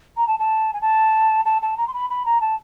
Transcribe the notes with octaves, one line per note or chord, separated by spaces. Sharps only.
A#5
A5
A5
G#5
A5
A5
A5
A#5
C6
B5
B5
A#5
A5